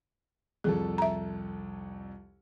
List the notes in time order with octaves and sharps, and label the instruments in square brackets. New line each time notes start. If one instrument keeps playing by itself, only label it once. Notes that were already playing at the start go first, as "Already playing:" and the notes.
[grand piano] C2 F2 A4 [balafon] G#4
[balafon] E5 A#5